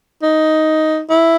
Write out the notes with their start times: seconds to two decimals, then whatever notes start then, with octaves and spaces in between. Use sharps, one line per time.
0.22 D#4
1.10 E4